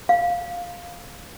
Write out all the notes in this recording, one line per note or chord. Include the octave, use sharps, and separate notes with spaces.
F5